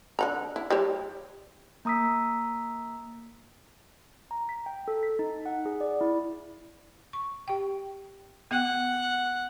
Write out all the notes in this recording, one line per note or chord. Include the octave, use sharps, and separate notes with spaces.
D3 F#5 A#5
E4
G3 E4 C#5
A#3 A#5 D#6 E6 B6
A#5
B6
G5
A4
B6
D#4
F#5
G#4
D5
E4
C#6
G4 G5
B3 F#5 G5